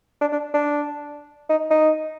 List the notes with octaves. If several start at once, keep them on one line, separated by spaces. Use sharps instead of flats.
D4
D4
D4
D#4
D#4